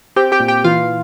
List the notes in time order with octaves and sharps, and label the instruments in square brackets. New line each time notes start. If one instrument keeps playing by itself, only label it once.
[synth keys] C4 G4 G5
G4 G5
A#2
G4 G5
E3 F4 F5